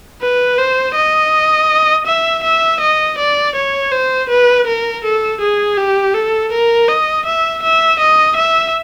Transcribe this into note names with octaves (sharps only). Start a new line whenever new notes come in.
B4
C5
D#5
E5
E5
D#5
D5
C#5
C5
B4
A#4
A4
G#4
G4
A4
A#4
D#5
E5
E5
D#5
E5